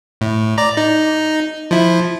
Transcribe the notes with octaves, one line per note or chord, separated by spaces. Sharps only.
A2
D5 A#5
D#4
F3 E4